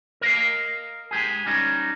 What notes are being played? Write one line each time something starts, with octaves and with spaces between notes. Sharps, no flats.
A#4 D#5 F5
G#3 G4 G#4
G3 C#4 D#4